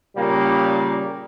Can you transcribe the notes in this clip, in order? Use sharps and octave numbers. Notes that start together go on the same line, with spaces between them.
A#2 C#3 G3 A#3